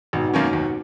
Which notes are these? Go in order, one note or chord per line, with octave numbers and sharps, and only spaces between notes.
G#1 G#2 B2
F#2 D#3 A#3 C#4
D#2